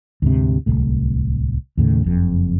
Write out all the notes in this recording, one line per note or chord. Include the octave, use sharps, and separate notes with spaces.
D2 G#2 C3
D1 G1 C2 A2
D#2 A2 C#3
F#1 F2